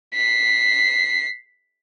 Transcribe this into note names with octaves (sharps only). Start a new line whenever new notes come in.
B6 C7